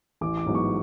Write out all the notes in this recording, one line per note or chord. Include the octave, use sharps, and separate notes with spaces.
A1 D6
D6
G#2 F#3 B3
C#6